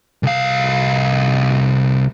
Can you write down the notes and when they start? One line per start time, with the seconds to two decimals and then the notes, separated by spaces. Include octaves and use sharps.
0.23 C2 F5